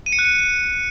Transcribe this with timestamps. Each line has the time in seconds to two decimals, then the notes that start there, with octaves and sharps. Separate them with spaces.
0.06 D#7
0.12 C#7
0.19 F#6
0.25 C#7